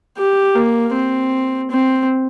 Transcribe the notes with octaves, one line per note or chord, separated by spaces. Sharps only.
G4
A#3
C4
C4